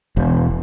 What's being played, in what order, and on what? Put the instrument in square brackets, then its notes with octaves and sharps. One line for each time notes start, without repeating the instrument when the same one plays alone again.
[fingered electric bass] E1